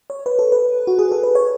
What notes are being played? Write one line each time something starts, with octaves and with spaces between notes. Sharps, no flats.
C#5
B4
A4
B4
F#4
G#4
A4
B4
C#5